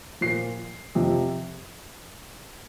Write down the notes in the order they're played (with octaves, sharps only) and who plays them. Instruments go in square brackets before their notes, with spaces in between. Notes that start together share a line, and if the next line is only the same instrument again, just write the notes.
[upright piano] A#2 F3 C7
F2 C3 F3